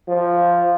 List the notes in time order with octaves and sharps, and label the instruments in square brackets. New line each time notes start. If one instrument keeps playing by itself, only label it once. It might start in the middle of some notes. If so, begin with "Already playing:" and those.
[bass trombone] F3